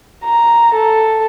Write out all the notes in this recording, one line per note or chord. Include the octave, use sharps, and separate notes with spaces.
A#5
A4